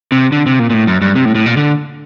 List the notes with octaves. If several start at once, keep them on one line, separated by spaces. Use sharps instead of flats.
C3
D3
C3
A#2
A#2
A2
F#2
G2
C3
A2
A2
A#2
D3